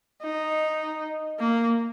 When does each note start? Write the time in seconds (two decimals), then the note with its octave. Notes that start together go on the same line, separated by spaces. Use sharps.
0.23 D#4
1.40 A#3